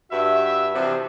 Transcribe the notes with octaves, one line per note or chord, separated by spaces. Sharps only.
G2 F#4 E5
C3 E3 F3 C4 D4